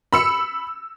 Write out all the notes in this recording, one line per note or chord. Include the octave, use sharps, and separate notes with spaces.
B5 E6 C#7